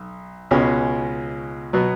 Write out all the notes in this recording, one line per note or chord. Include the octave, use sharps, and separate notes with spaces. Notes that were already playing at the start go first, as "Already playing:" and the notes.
Already playing: B1
C#2 B2 G#3 C#4
B2 F#3 B3